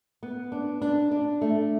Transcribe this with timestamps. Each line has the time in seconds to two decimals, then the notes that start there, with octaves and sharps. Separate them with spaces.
0.23 B3
0.52 D4
0.82 D4
1.12 D4
1.41 A3